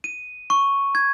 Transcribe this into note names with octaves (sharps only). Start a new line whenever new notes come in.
D#7
C#6
G#6